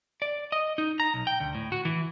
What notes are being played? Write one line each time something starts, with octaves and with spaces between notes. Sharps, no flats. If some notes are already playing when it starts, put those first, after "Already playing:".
D5
D#5
D#4
A#5
B1
G5
D2
A2
F#4
E3